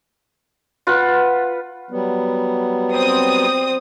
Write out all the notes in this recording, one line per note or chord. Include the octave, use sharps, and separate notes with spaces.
F4 B4 F#5
F#3 G3 B3
C4 D#6